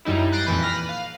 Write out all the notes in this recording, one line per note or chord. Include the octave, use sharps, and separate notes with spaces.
F#2 G3 D#4 E4
F#6 G6 A6 A#6 C7 D7
F2 A#2 E3 B4
F6 A#6 B6
B4
F5